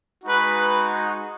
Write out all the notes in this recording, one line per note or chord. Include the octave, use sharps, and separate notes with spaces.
G#3 D#4 F#4 B4